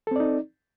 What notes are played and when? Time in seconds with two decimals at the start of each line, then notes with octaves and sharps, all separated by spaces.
0.07 A4
0.11 C4
0.16 D5
0.20 D#4